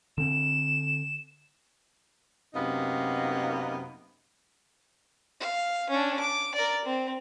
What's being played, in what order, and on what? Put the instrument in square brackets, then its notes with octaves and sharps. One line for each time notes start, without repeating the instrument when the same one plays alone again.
[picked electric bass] D3 C4 [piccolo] E7
[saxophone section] F#2 C3 A#3 B3 D#4
[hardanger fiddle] F5
C#4 D4
D6
A#4 D5
C4